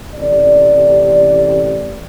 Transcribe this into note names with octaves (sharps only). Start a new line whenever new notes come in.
A1 C3 D5